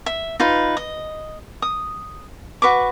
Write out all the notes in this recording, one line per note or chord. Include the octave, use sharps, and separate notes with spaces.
E5
D#4 F4 B4
D#5
D#6
F#4 B4 C#6 D6